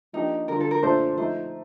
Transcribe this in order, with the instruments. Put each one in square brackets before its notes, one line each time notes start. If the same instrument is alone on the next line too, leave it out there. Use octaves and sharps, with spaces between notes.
[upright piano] F3 A#3 D4 G4 [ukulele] D#4
[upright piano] D3 G3 D4 F4 [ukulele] A#4
[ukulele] A4
A#4
[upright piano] A#2 A3 D4 F4 A4 [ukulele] C5
[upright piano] F3 A3 D#4 [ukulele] C5